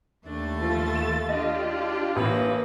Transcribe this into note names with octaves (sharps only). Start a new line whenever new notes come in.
D#2 A3 D4 A6
F3 F4 A4
E7
D4 F4 G4 D#5
A1 A#3 B4